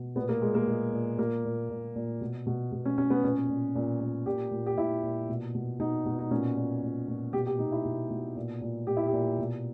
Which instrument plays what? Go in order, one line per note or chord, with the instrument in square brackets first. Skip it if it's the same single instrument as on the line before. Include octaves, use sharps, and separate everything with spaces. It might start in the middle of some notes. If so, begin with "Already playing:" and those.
Already playing: [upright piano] B2
A#2 B3
A#3
A#2 G#3
A#3
A#2 G#3
A#2
A#2 A#3
A#2
A#2
A#2
B2
B2
B2
C#4
B2 C#4
B3
A#2 C#4
A#2
A#2
A#2
A#2 G4
A#2
G4
A#2 E4
A#2
B2
B2
B2 D#4
B2
D#4
A#2 C#4
A#2
A#2
A#2
B2 G4
G4
B2 D#4
E4
B2
B2
A#2
A#2
A#2 G4
E4
G4
A#2
B2